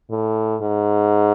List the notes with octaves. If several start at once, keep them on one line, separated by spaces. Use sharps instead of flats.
A2
G#2